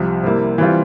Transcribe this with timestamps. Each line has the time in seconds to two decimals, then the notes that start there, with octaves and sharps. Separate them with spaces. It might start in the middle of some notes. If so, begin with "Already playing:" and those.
Already playing: C2 C3 F3
0.23 C3 G3 A#3 E4
0.58 E3 G3 C4 F4